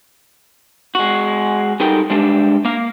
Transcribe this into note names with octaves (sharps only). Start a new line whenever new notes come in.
G#3 F#4
G3 D#4 A4 A#4 G5
G3 G#3 D4 G4 E5
A#3 F5